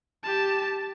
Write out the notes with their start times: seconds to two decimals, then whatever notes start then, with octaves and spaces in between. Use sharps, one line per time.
0.23 G4 A5